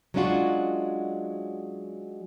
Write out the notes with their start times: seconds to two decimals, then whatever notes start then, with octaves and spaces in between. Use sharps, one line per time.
0.14 F#3 G#3 C#4 D4 F4 F#4